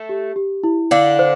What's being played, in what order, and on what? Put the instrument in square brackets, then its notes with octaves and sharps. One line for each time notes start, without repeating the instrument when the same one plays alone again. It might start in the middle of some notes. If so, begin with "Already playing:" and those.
Already playing: [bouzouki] A3 A4
[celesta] G4
G4
E4
[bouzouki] D3 D4 [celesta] F5
[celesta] C5